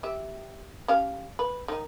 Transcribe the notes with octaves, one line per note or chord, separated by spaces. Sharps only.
G4 E5
C#4 G4 F5
B4
D#3 D#4